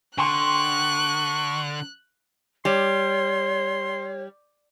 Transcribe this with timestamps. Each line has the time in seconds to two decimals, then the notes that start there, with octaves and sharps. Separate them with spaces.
0.18 D3 G5 C6 C#6 F#6
2.65 G3 C#5 C6